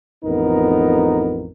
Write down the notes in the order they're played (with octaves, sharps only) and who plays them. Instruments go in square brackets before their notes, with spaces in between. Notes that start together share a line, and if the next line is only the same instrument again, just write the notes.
[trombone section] A1 F2 B3 D#4 A#4